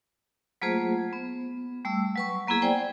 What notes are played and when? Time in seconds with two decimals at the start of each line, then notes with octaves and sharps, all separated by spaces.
0.62 F#3 A3 A#3 F4 G#4 C5
1.13 B3
1.85 G3 A3 E6
2.16 F#3 B4 C#6
2.48 F#3 A#3 B3 E4 G#4
2.62 C5 D5 G5 G#5